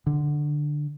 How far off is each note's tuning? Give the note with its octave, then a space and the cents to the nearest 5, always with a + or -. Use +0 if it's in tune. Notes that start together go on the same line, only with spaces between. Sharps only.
D3 +10